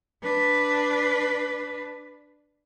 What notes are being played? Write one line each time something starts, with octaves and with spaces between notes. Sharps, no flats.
D4 B4